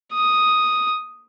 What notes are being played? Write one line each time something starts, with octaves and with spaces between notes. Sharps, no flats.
D#6